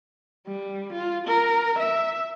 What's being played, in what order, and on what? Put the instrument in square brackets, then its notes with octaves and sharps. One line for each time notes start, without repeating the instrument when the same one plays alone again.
[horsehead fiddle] G3
F4
A#4
E5